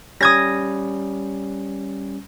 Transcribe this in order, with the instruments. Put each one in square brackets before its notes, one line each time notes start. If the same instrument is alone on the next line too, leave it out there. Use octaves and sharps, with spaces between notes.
[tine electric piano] G3 C#4 [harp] D#6 G#6 A#6